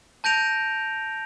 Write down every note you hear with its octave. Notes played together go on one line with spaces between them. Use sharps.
A5 G6 A#6 D7 F7